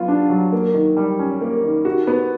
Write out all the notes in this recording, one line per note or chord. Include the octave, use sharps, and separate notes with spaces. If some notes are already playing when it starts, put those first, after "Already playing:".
Already playing: F#3 B3 F4
D4
F#3
A#3
D#3
G3
C#4
A#3
D#3
F#4
B3